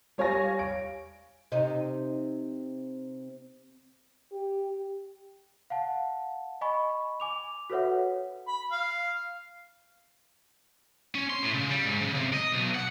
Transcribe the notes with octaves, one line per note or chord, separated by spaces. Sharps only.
G3 C#5 F5 G#5 A#6
D7
C3 D#4
G4
F5 F#5 A5
D#5 G#5 B5 C#6
G#5 D6 F7
F#4 A4 B4 C#5 E5 F#5
B5
F5
C#4
C6
A2
C#3
G3
G#2
C#3
C3
D#5
B1
F#5